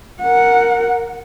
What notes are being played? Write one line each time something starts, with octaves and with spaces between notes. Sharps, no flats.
A#4 F#5